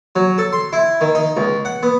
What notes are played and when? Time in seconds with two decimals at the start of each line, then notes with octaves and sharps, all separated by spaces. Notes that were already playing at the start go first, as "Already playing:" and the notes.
0.16 F#3
0.38 A4
0.53 C6
0.73 E4
1.01 D#3
1.15 D#4
1.37 C#2
1.65 F#5
1.83 B3